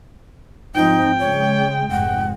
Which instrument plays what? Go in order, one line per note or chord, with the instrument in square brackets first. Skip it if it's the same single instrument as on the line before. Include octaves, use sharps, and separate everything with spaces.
[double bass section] G#2 F3 C4 [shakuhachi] D#4 [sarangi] G5
[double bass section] C#3 G#3 [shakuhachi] C#5
[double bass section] F1 G#2 G#3 [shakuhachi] F#5